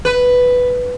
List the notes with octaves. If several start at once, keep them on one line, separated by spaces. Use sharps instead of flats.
B4